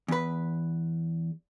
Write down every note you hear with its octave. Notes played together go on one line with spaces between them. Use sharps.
E2 B4